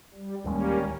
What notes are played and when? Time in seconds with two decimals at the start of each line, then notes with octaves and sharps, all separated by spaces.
0.14 G3
0.44 D1 D#2 G3 G#3 A#3 C#4